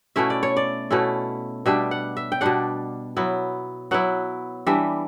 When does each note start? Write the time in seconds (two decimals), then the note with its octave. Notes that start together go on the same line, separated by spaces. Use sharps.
0.16 B2 A3 C#4 E4 E5
0.30 D5
0.43 C#5
0.57 D5
0.91 B2 A3 C#4 E4
1.66 B2 G3 D4 E5
1.91 F#5
2.17 E5
2.32 G5
2.41 B2 G3 D4 F#5
3.17 F#3 B3 E4
3.91 F#3 B3 E4 F#5
4.67 E3 G3 D4 E5